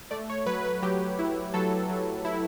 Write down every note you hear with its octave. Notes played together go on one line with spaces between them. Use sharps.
A3 D5
C#5
F#3 B4
B4
F#3 G4
E4
F#3 A4
F#3
E4